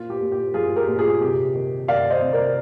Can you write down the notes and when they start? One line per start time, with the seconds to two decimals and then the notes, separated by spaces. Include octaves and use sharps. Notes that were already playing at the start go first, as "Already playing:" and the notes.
Already playing: A#2 F4
0.10 G4
0.21 A#2
0.32 G4
0.54 F3 F4 G#4
0.76 G4 A#4
0.87 A#2
0.99 F4 G#4
1.20 C3 G4
1.55 D#3
1.88 D#3 D5 F5
2.10 C5 D#5
2.21 C3
2.33 A#4 D5